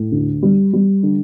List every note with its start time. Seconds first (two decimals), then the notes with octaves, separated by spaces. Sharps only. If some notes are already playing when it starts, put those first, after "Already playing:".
Already playing: A2
0.12 D2
0.43 G3
0.73 G3
1.03 D3